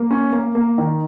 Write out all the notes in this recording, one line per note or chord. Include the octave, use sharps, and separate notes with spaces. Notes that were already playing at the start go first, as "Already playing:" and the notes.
Already playing: A#3
C#4
A#3
A#3
D#3